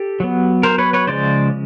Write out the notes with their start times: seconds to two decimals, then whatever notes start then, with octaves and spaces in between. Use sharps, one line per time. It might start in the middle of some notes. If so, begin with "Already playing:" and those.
Already playing: G4 A4
0.20 F#3 B3
0.63 A#4 C5
0.78 B4 C#5
0.93 B4 C#5
1.07 C#3 F3 G#3 C5 D5